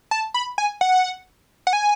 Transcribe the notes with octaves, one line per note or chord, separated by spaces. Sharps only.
A5
B5
G#5
F#5
F#5
G#5